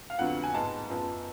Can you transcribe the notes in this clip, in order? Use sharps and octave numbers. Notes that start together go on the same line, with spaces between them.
F5
F2 D3 F#3 B3 F#5
G#5
G#2 G#3 B3 A5
F#2 F3 B3